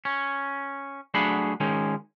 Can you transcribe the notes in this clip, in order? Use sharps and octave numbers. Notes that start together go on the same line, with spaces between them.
C#4
F#3 A3 D4 G#4 F#5 B5
D#3 G#3 C#4